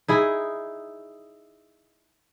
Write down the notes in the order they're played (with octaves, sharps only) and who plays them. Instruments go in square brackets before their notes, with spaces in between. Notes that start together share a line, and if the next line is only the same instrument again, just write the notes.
[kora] D#4 E4 G#4